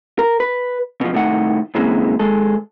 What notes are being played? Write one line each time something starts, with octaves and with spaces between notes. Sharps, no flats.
A#4
B4
B2 F3
C2 A2 D#3 F#5
F#2 D3 E3 G#3 A#3 C4
D#2 G#3 A4